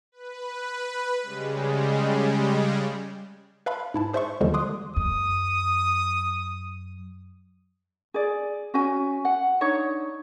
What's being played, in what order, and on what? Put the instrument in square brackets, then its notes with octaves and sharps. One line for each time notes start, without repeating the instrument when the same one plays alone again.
[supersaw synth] B4
C#3 G3 G#3
[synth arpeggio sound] B4 E5 F5 A5 B5 C6
G#2 E4 A5
G#4 C5 D5 E5 C6 C#6
D#2 D3 D#3 F3 G3 G#3
C6 D6 D#6 F#6
[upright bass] F#2 [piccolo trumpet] D#6
[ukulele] G#4 D5
C#4 F#4 G#5
F#5
D4 D#4 C#5